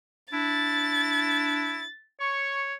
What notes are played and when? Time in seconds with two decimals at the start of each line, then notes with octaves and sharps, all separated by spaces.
0.33 D4 E4 A6
2.20 C#5 C#6